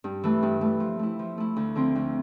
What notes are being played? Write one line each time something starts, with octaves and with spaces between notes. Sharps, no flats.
G2
E3 A3
G2
E3 A3
F3
A3 E4
F3
A3 E4
D2
D3 F3 C4 F4
D2